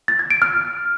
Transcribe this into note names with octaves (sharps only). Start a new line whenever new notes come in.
A6
G#6
D7
F6